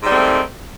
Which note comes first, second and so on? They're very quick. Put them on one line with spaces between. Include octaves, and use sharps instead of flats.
G#2 G3 C4 A3 D#3